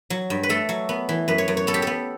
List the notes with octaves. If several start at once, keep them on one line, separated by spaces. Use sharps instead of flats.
F#3
G2
B4
A3 A4
F#3
B3
E3
F#2 B4
C#5
F#2
C#5
B3 A4
G4
B3 A4